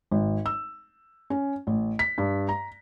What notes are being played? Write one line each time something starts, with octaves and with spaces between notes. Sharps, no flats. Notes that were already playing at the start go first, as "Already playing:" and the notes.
G#1
E6
C#4
A1
B6
G2
A#5